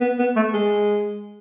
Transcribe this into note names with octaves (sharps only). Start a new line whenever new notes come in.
B3
B3
A3
G#3